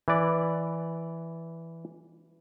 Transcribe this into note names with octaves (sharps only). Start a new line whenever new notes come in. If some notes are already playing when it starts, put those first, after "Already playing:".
E3 B4 D5